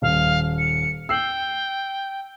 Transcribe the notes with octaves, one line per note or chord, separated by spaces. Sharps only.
D#1 F5
C#7
G5 E6 C7 F#7